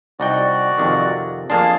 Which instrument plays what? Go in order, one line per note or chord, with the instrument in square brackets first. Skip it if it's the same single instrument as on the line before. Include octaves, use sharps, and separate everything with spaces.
[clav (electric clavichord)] C2 D#4 G5 [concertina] F#4 D5
[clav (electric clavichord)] F2 C3 D#3
[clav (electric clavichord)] F2 A#3 D4 [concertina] G#4 A5 C6